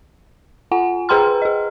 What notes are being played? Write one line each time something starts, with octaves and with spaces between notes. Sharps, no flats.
F4 F#5 G#5
G#4 B4 G5 A#5 C6 F6
G#4 D#5